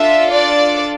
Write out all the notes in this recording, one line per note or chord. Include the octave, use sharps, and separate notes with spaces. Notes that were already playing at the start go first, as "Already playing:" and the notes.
Already playing: D4 F4 A4 E5
D5